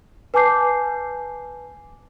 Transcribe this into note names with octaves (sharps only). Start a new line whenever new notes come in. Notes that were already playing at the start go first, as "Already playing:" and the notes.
B4 G#5 A5 D6 G6 C7